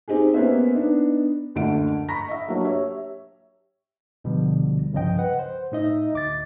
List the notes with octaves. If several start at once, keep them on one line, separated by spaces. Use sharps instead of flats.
C4 D#4 G4 G#4
A#3 B3 C#4 C5 E5
B3 D4 D#4
F#1 D2 D3 F#5 D7
A#5 B5 C#6 A#6 B6
D#5 E5
F#3 A#3 D4 F#4 C#5
G4 C#5 E5
D2 B2 D3 F3 G3
C2 G2 C#3 F3 D#5 G5
B4 F#5
C5
A2 D#4 D#5 E5
D2 D6 A6